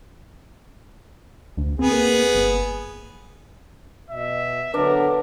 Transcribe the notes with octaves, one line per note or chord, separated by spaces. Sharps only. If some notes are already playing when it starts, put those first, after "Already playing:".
D2
B3 C4 G#4
A#3
G1
B2 E5
D3 F#3 B3 D4 A#4 B4